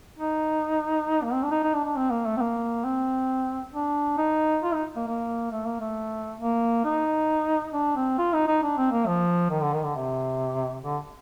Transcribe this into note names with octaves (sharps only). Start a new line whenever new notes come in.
D#4
A#3
C4
D4
D#4
D#4
D4
D4
C4
A#3
A3
C4
A#3
C4
D4
D#4
F4
D#4
A#3
A#3
A3
A#3
A3
A#3
D#4
D4
C4
F4
D#4
D#4
D4
C4
A#3
F3
D#3
D3
D#3
D3
C3
D3